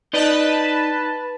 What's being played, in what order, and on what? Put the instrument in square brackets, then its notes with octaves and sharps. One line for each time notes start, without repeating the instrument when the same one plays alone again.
[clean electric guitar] D#4 D5 D#5 [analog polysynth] B4 A5